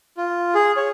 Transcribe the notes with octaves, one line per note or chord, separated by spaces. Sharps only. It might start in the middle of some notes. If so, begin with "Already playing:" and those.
F4
G#4
C#5